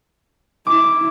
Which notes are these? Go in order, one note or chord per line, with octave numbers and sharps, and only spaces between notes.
E4 D6